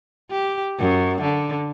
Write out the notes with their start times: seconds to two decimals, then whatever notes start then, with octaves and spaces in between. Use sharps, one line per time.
0.31 G4
0.79 F#2
1.22 D3